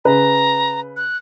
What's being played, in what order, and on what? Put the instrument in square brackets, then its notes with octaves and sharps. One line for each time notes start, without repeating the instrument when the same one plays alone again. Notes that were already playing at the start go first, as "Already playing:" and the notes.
[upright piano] C#3 B4 [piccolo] A#5
[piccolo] F#6